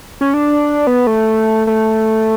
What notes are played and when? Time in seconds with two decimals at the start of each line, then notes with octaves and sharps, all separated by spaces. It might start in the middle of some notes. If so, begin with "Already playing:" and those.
0.21 C#4
0.34 D4
0.87 B3
1.07 A3
1.67 A3